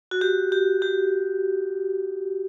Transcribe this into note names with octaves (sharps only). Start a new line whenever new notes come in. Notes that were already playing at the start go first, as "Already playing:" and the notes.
F#4
G4
G4
G4